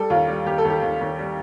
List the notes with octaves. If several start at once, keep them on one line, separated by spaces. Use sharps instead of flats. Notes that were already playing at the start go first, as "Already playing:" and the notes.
Already playing: G3 A4
D#2 F4
G3
D#2 G4
A4
D#2 G4
D#2
D#2
G3